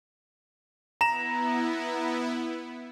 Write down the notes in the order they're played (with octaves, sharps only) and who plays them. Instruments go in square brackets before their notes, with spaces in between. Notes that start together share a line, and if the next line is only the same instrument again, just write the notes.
[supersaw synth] B3 E4 [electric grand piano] A#5 E7